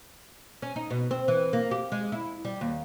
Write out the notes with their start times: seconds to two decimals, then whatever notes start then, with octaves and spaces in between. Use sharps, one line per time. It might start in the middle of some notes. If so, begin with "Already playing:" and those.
0.62 C#4
0.76 D#4
0.90 B2
1.11 C4
1.28 E3
1.53 A#3
1.71 G4
1.92 G#3
2.12 E4
2.45 G3
2.61 D#2